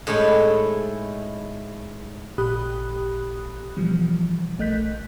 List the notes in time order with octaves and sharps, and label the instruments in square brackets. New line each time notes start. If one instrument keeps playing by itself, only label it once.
[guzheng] A2 G#3 A3 D#4 E4
[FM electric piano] A1 A#2 G4 B5 D#6 F#6
B2 E3 F3 G3
A#1 A3 D#5 F#6 G6 B6